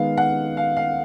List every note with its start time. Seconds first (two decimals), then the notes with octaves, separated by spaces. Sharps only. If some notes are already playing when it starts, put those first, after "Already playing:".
Already playing: D#3 G#3 B3 F5
0.18 F#5
0.57 F5
0.77 F5